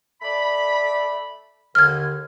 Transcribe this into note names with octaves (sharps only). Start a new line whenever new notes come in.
A3 D5 B5
D#2 D3 F6 G#6